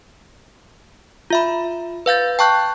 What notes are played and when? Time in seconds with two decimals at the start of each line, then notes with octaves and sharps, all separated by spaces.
1.30 F4 E5 B5
2.06 B4 F5 G6 A6
2.39 G5 A5 C#6 F#6 G6